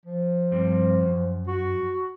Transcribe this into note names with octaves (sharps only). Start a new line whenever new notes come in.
F3
G2 G3 C4
F#2
F#4